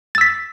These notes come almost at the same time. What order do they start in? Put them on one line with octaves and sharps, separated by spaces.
A6 E6 B6